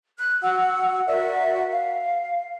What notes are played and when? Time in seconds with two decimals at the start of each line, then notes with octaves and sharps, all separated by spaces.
0.18 F#6
0.42 F#4 F#5 E6
1.07 F#4 A#4 D5 E5
1.72 F5